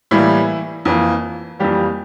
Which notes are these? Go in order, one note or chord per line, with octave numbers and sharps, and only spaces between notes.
A2 E3 G3 A#3 E4
F2 E3 A#3
F2 E3 G3 A#3 G4